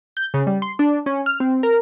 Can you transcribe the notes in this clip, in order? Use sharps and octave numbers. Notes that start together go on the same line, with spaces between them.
G6
C#3
G3
C6
D4
C#4
F6
C4
A#4